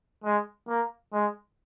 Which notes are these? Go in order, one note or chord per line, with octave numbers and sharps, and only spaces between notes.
G#3
A#3
G#3